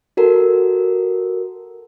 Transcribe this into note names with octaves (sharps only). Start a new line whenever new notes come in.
F#4 A4 A#4